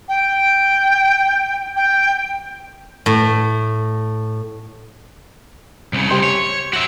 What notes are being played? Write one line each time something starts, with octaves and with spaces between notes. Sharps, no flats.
G5
G5
A2
C2 C#3
G4 C5 C6
C#5
F#4 E5